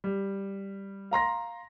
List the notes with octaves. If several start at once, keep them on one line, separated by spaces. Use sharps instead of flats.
G3
F5 A#5 C6 A#6